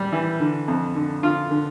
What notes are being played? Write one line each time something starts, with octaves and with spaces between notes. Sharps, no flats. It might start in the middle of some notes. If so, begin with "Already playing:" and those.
Already playing: G3
E3
D3
F2
D3
D3 F4
D3